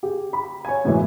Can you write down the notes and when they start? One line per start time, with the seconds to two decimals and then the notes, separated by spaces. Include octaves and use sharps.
0.03 G4 G#4
0.33 B5
0.65 C#5 G#5
0.85 F#2 A2 C#3 E3 G#3